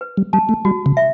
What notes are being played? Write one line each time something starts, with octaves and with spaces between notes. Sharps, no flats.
B4
G3
G3 A5
A3
G3 F#4
C#3
E5